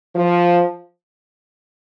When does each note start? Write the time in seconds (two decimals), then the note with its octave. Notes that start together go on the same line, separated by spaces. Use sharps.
0.15 F3